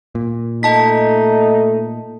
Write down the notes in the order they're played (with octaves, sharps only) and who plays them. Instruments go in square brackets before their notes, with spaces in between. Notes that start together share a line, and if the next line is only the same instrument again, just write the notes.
[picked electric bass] A#2
[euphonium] A3 [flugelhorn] D#4 [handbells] D#5 A5 B6